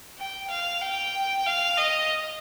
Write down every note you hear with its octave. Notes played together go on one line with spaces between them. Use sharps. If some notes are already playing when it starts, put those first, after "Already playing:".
G5
F5
G5
F5
D#5